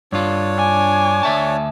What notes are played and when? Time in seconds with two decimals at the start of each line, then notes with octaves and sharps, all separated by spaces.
0.12 G2 D4 F4 C#5
0.58 G#5 D6
1.23 D2 E5 A5